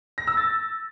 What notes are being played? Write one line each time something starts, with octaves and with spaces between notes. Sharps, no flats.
A#6
E6
A6